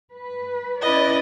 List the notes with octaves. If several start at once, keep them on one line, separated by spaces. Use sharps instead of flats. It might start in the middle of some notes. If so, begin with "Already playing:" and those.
B4
C#4 E4 B4 D5 D#5